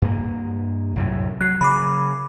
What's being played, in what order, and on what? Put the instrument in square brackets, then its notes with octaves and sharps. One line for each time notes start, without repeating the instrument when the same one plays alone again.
[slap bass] G2 A#3
C2 F#2 A2
[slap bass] F#3 [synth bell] F#6 C7
[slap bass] C#3 F#3 [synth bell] B5 D6